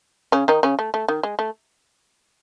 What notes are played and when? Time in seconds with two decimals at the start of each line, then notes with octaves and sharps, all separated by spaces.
0.32 C#3 C#4
0.48 D#3 D#4
0.63 C#3 C#4
0.79 A3
0.94 A3
1.08 D#3
1.23 G#3
1.39 A3